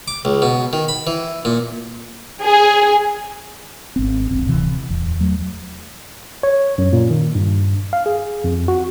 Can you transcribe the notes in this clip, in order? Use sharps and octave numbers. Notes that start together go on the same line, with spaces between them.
D6
C#2
B2
D#3
B5
E3
A#2
G#4
G#1 C4
E1 A#1 C4
D1 C3 E3
D1 E2
E2 F#3 A3
C#5
F#2
A#2
D#3
G2
F5
G#4
F2
F#4